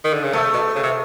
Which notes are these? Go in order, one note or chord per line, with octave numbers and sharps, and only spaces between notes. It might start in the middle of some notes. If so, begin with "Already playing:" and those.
D#3
D3
C#3
C3 A3
B2
C#3
C3